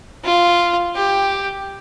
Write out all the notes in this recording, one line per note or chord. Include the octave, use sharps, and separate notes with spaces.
F4
G4